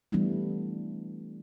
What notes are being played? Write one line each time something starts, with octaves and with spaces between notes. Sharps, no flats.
E3 G3 A3 B3 D4 E4